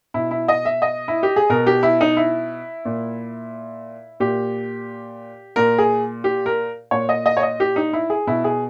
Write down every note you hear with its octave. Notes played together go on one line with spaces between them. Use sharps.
B2 E4
E4
D#5
E5
D#5
E4
G4
G#4
B2 A#4
G4
E4
D#4
E4
A#2
A#2 G4
A#2 A#4
G#4
G4
A#4
A#2 C#5
D#5
D#5
C#5
D#5
G4
D#4
E4
G#4
B2 E4
G#4